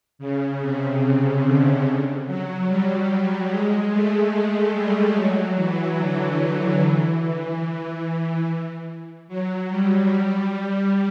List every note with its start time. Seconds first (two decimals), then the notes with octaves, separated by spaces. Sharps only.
0.19 C#3
0.60 C3
1.02 C#3
1.43 D3
2.26 F#3
2.67 G3
3.49 G#3
3.91 A3
4.32 G#3
4.73 G3
5.15 F#3
5.56 E3
5.97 D3
6.40 D3
6.80 E3
9.28 F#3
9.70 G3
10.11 G3